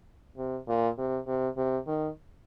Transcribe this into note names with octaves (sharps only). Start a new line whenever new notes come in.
C3
A#2
C3
C3
C3
D#3